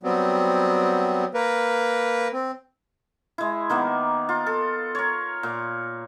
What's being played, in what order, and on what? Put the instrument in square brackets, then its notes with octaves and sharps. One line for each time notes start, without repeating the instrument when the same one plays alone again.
[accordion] F#3 G3 B3 C4
A#3 A#4 B4
C4
[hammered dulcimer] G#3 E4
D#3 A#3 B3
F4
A4
A#4 C#5
A#2